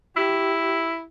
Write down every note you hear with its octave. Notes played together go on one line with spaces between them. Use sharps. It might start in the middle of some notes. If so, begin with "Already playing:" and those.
E4 G4